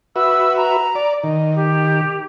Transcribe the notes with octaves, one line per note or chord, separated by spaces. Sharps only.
F#4 B4 E5 E6
A#5
D5
D#3 D#5
G4